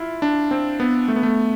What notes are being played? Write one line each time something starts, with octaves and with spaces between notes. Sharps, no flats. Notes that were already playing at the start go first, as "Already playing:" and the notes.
Already playing: E4 F4
D4
C4
B3
A3
B3
A3